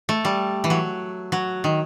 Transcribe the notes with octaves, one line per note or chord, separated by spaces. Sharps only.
A3
G3
E3
F#3
F#3
D#3